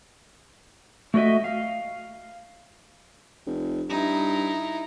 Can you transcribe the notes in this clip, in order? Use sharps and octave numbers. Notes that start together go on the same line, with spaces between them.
A3 F#4 C#5 D#5 E5
F5
F1
G2 D#4 E4